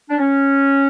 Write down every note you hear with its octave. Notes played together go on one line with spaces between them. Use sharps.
D4
C#4